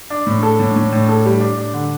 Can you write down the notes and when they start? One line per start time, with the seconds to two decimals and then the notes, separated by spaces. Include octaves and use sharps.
0.10 D4
0.27 A2
0.43 A4
0.60 A2
0.76 A2
0.92 A2
1.09 A4
1.25 G3
1.41 D4
1.58 D4
1.74 D3